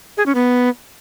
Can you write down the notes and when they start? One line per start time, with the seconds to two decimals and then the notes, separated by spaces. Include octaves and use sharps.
0.17 G#4
0.26 C#4
0.35 B3